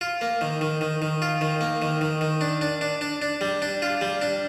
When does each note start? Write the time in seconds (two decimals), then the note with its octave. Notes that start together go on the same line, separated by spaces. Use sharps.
0.01 F4
0.21 A#3
0.41 D#3
0.61 D#3
0.81 D#3
1.02 D#3
1.22 F4
1.41 D#3
1.61 A#3
1.82 D#3
2.01 D#3
2.21 D#3
2.41 D4
2.61 D4
2.81 D4
3.01 D4
3.22 D4
3.41 G3
3.62 D4
3.82 F4
4.01 G3
4.21 D4